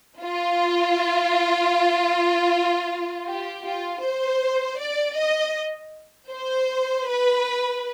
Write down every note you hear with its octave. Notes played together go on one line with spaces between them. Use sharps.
F4
G4
F4
C5
D5
D#5
C5
B4